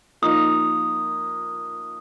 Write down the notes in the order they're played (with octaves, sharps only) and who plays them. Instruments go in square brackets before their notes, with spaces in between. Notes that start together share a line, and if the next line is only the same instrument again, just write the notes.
[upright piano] F3 A#3 D#4 [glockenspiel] D#6